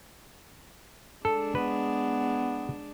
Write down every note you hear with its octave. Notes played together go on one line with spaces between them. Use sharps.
G#3 D4 A4
B3 B4